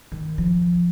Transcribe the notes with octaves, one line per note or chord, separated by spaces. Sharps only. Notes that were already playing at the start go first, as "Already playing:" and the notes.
D#3
F3